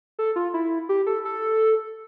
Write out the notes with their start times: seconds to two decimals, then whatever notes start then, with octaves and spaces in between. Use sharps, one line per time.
0.19 A4
0.36 F4
0.54 E4
0.89 G4
1.06 A4
1.25 A4